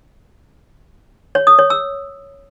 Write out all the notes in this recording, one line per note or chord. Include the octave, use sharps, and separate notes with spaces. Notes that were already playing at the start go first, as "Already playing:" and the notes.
C#5
D#6
C#5
E6